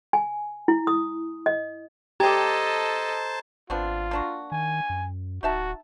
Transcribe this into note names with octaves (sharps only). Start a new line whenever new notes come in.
G#5
E4
D#6
D#5
G4 A4 C5 D#5 A5 A#5 G#6
G#1 B3 C4 D4 F4
A#3 D4 F#4
D#3 G#5
F#2
D1 D#4 F#4 E5 A5